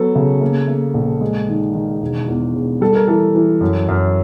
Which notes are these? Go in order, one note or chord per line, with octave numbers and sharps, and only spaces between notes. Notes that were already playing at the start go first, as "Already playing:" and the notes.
Already playing: F#3 B3 A4
C#3
A#3
A#3
A#1
G#3
D#3
D#3
E1
E2
E1
G3 A4
A#4
E3 A4
E3
F#2
F#2